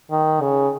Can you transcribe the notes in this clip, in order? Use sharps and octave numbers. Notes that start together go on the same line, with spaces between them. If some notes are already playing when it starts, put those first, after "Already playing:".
D#3
C#3